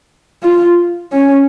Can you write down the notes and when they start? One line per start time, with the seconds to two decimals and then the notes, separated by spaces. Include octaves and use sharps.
0.43 F4
1.12 C#4